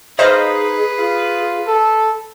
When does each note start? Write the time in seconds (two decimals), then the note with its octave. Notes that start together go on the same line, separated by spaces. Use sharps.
0.19 D#4 G#4 B4 C5 D#5 F5
0.98 F4
1.67 A4